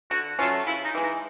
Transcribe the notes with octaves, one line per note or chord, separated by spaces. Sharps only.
D3 F#4
F#3 A3 C#4 F4
C#3 E4
D#4
E3 G#3
D#4